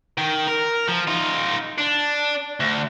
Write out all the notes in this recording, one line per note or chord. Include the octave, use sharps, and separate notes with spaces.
D#3
A#4
F3
D#4 F4
D4
D2